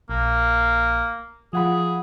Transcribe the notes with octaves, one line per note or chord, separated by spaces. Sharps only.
A#1 A#3
F3 G#4 F#5 B5